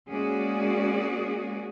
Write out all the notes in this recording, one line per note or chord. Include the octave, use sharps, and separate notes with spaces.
G#3 A#3 C#4 F#4 G#4 D5